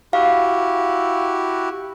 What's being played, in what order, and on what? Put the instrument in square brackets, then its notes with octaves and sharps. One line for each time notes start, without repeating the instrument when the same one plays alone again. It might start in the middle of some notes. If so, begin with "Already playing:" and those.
[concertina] E4 F#4 G4 [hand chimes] F5